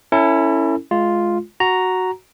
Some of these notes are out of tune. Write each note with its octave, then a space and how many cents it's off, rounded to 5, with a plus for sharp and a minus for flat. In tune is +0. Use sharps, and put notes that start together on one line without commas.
C#4 +0 E4 +0 A4 +35
G#3 +25 F4 +0
F#4 +0 A#5 +0